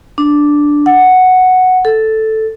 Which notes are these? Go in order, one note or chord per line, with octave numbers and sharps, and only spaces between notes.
D4
F#5
A4